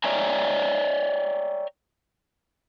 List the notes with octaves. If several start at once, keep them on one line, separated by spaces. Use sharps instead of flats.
C#5 D5 E5 G5 G#5 A#5